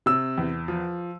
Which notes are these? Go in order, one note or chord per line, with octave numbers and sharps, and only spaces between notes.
C3 E6
E2
F3